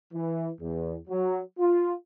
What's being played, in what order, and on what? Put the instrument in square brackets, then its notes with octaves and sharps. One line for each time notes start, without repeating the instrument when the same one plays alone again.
[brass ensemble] E3
E2
F#3
F4